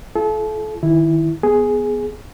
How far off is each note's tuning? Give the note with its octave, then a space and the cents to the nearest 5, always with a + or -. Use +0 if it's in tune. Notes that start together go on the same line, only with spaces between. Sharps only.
F4 -45 A4 -35
D#3 +0 E4 +0
B3 +0 G#4 +5